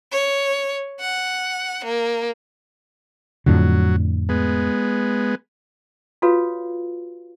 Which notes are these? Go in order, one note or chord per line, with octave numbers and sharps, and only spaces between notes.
C#5
F#5
A#3
F2 A2 D3 F#3
G#3 B3
F4 F#4 A4 B4 C#5 F5